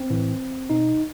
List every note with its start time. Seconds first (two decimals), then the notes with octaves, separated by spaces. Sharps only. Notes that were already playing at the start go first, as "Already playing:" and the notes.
Already playing: C4
0.10 A2 E3
0.70 B2 D#4